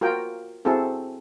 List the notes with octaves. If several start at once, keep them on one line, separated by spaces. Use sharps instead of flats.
F4 F#4 A#4 G5
C4 E4 F#4 G#4 A4